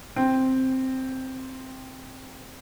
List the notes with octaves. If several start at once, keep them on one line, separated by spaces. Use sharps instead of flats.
C4